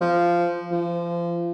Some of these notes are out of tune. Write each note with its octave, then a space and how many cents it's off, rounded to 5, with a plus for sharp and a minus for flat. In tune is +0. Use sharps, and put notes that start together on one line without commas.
F3 -10
F3 -30